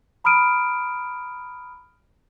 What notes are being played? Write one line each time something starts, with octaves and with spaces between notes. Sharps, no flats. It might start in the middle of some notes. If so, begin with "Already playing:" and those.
A#5 B5 D#6 F6 D7 D#7